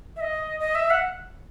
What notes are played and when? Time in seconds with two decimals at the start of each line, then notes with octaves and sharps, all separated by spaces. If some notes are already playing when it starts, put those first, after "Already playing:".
0.16 E5
0.21 D#5
0.60 D#5
0.75 E5
0.90 F#5